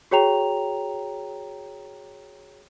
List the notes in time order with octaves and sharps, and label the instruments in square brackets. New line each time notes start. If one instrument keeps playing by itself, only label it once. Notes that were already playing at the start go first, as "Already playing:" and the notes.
[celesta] F#4 G#4 C#5 G5 A#5 F7